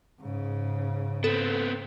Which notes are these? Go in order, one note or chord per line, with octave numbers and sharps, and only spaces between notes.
G#2 C#3
B3 C4 A4